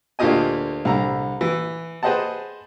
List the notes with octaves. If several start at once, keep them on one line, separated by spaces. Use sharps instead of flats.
D2 A#3 F4 G4 D#5 G#5
C2 D3 A#5
E3
G#4 B4 C5 D#5 F#5 A5